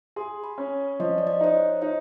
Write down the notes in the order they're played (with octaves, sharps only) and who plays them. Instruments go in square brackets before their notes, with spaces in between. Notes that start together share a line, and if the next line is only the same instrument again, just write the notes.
[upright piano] G#4 [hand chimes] C6
[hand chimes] B5
[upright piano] C#4
[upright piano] F3 [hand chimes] D#5
[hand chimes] D5
D#5
[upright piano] D#4 [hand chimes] C5
[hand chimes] C#5
[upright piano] D#4 [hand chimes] C5